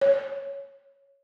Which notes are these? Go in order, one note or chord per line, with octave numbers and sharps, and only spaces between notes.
C#5